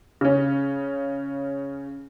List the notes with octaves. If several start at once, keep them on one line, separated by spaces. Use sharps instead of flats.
C#3 C#4